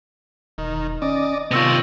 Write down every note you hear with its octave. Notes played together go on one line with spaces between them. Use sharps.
E1 D#3
C#4 D5 D#5
C3 D#3 B3 F4 C#6 E6 A#6